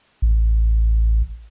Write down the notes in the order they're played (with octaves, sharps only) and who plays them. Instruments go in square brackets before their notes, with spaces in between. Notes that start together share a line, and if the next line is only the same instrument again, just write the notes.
[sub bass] A1